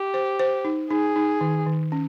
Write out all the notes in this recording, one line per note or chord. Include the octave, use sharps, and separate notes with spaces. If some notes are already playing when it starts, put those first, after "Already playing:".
Already playing: G4
C5
C5
D#4
D#4 G#4
D#4
D#3
D#3
C#4